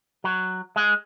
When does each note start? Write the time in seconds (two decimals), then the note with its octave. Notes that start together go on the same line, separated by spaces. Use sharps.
0.24 F#3
0.76 G#3